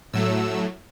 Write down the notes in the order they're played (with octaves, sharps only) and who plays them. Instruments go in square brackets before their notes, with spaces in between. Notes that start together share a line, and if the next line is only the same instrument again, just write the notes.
[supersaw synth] A2 F#3 A3 E6